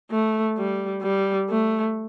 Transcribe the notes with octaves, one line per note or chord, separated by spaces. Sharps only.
A3
G3
G3
A3